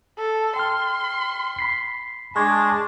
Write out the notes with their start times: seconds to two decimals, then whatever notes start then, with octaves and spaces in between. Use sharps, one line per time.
0.18 A4
0.56 G5 C6 F6
1.59 B5 B6 C7
2.36 G#3 D4 A5 C6 C#6 G#6